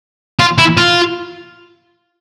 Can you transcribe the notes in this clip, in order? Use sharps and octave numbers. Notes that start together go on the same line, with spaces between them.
F4
E4
F4